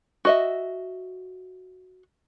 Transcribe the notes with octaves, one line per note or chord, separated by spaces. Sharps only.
F#4 D#5 E5